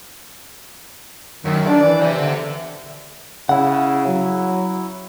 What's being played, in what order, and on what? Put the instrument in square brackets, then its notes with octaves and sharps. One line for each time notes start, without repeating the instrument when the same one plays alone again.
[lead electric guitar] F#2 [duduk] D#3
[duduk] D4 [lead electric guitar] D5
[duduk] E3
[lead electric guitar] C5 E5
[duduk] D3
[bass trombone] C#3 [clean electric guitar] E4 F#5
[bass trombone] F#3